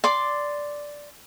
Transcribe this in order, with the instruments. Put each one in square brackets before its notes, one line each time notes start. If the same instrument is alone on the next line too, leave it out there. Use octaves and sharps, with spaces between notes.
[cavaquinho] D5 C6 D6